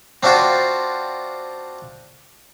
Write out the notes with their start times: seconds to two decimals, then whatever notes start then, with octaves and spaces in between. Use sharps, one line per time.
0.23 C4 D4 F4 F#4 C5